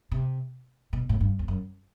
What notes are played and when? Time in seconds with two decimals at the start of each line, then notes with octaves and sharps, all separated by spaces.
0.11 C3
0.93 B2
1.09 A2
1.21 G2
1.39 E2
1.48 F#2